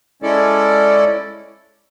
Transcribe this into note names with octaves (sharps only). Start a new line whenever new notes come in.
G#3 C#4 E4 A4 D5